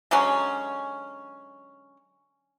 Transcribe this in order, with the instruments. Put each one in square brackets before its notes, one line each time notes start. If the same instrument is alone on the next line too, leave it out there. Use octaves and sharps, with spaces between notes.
[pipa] D3 F#3 G#3 C#4